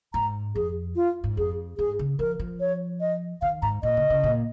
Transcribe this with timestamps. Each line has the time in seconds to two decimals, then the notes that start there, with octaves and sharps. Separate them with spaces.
0.14 G#2 A#5
0.55 F2 G#4
0.96 F4
1.24 G#2
1.37 F2 G#4
1.78 G#2 G#4
1.99 C#3
2.19 F3 A#4
2.39 F3
2.60 C#5
3.01 D#5
3.42 D#3 F5
3.62 G#2 A#5
3.83 A#2 D#5
3.97 C#3
4.10 C#3
4.23 A#2